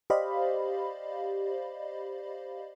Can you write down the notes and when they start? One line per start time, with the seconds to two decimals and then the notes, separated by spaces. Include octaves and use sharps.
0.10 G4 C5 D5 D#5 F5 B5